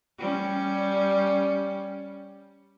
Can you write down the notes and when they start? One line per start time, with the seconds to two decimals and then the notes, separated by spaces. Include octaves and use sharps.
0.18 G3 C#4